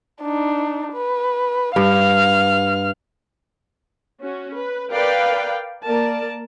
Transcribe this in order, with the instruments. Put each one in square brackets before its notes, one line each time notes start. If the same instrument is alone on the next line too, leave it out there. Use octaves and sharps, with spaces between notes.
[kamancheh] D4 D#4
B4
[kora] G2 [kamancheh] F5 F6
[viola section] C#4 F#4
B4
A#4 B4 D5 F5 G5
A#3 A#4 D5 A5